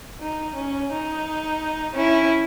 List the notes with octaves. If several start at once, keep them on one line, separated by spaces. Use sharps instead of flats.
D#4
C#4
D#4
C#4 E4